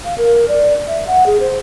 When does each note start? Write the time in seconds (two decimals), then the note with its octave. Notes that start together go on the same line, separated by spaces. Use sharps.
0.05 F5
0.18 A#4
0.48 D5
0.88 E5
1.07 F#5
1.26 G#4
1.40 C5